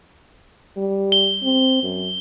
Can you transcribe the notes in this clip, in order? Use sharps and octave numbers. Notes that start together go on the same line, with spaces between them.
G3
G7
C4
F#2